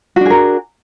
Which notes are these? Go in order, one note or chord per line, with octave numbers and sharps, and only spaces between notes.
D4 F#4 G#4 A#4